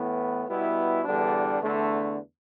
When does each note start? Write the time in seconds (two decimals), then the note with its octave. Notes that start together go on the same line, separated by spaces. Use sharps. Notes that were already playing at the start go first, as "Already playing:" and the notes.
Already playing: A2 E3 B3
0.48 B2 G3 B3 E4
1.04 E2 D3 G3 B3 D4
1.61 E2 D3 A3 D4